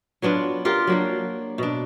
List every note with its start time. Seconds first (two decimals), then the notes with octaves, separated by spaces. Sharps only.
0.22 F#3 B3 D4 F4
0.65 F4 G4 A#4 F5
0.87 F#3 A#3 D4
1.58 B2 D4